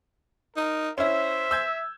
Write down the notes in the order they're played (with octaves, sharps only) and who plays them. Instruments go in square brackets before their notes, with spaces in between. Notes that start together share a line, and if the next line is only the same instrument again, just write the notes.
[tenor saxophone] D#4 [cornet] A#4
[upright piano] C#4 E4 [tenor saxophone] C5 [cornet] E5
[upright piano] E6 G6 G#6